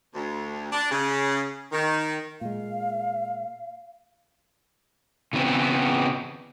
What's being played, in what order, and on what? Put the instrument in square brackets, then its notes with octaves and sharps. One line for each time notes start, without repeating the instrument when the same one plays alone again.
[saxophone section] D2
D4
C#3
D#3
[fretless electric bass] A#2 G#3 [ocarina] F5
[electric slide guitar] C#3 E3 B3 C4